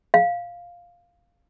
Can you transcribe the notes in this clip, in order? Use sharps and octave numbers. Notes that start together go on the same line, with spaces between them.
F5